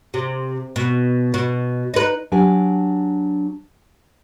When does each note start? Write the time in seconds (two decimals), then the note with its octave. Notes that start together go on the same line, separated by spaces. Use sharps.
0.14 C3
0.76 B2
1.34 B2
1.94 D#4 B4
2.32 F#3 D4 G4 G#5